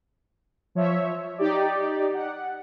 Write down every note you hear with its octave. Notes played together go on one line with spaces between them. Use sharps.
F3 C#5 E5
D#4 G4 D5
F#5